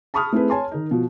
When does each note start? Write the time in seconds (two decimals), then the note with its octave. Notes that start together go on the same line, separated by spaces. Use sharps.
0.14 A5 B5 C#6 D#6 F6
0.32 A3 C4 E4 G#4 B4
0.50 C#5 G#5 A5 C6
0.72 D#3 D#4
0.91 B2 F3